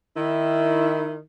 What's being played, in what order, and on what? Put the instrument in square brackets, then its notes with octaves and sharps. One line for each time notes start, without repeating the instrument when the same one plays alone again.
[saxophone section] D#3 E4